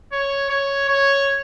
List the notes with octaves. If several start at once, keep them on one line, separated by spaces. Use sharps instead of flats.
C#5
C#5
C#5